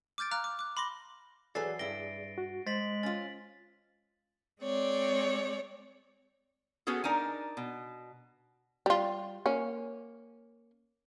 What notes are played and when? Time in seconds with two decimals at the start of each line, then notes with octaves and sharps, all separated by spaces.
0.18 D6 F6 G6 A6 D7
0.31 F5 A#5 D6 F6 F#6
0.44 D6
0.59 D6 F#6
0.77 B5 C6 D6 A#6 G7
1.55 E3 F#3 G#4 A4 B4 D5 A6 C7
1.79 G2 E4 A#6 D7 G7
2.38 F#4
2.67 G#3 C5 A6 B6 F#7
3.03 C#4 F4 A6
4.61 G#3 C4 C#5 D5
6.87 B3 C#4 F#4 G#4 A4
7.04 D4 D#4 A#4 G#5
7.57 B2
8.86 G3 F4
9.46 A#3 C#4